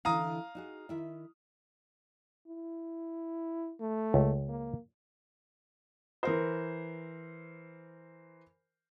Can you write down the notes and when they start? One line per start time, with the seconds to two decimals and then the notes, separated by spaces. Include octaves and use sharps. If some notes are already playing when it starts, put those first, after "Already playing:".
0.05 D3 E3 E4 F5 A#5 D#6
0.55 D#4 F#4 G#4
0.89 D#3 E4 E5
2.47 E4
3.80 A3
4.14 C#2
4.49 A#3
6.23 E3 A#4 C5